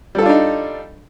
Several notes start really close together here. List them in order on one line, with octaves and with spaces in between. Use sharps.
G3 A4 F4 D4 D#4